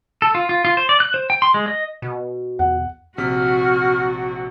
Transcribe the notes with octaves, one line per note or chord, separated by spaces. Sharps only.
A4
F4
F4
F4
C5
D5
F#6
C5
G5
C6
G#3
D#5
B2
E2 F#5
A#1 C3 F#4 F6 B6